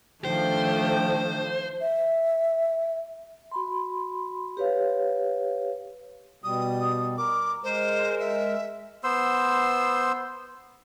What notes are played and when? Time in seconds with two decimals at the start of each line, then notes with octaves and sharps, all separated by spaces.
0.25 D#3 F3 A3 D4 C5 G5
1.80 E5
3.51 F#4 B5 C6
4.57 G4 B4 C#5 F5
6.44 B2 G3 D#6
7.18 A#4 D6
7.64 G#3 A#4 C5
8.20 E5
9.04 B3 C5 C6 E6